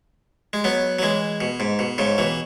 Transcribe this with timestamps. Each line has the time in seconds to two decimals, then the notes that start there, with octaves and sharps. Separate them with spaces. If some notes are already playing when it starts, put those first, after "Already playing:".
0.53 G#3
0.64 F#3 B3
0.99 F#3
1.02 E3 G#3
1.41 B2
1.60 G#2
1.79 B2
1.98 G#2 C#3
2.18 B2 E3